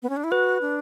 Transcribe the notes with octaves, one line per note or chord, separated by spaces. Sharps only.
B3
C#4
D4
E4
F#4 B4
D4